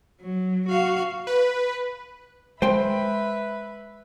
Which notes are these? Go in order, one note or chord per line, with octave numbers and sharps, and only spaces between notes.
F#3
F#4 F5
B4
G#3 B4 C5 E5 G5 B5 C6